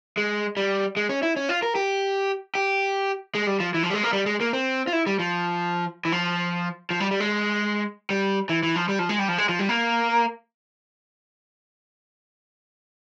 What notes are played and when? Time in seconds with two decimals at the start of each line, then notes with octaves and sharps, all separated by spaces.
0.17 G#3
0.57 G3
0.97 G#3
1.09 C#4
1.23 E4
1.36 C#4
1.49 F4
1.63 A#4
1.75 G4
2.55 G4
3.35 G#3
3.47 G3
3.60 F3
3.74 E3
3.83 F3
3.90 G3
3.94 G#3
4.03 A#3
4.13 G3
4.26 G#3
4.40 A#3
4.53 C4
4.88 F4
4.93 E4
5.06 G3
5.19 F3
6.05 E3
6.12 F3
6.90 F3
7.00 G3
7.11 G3
7.20 G#3
8.10 G3
8.49 E3
8.63 E3
8.76 F3
8.89 G3
8.99 F3
9.09 G#3
9.19 G3
9.28 F3
9.38 G#3
9.49 F3
9.59 G3
9.69 A#3